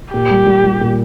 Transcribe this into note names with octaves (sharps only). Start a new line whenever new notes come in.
A#2 G4
G3
G3
G3
A#2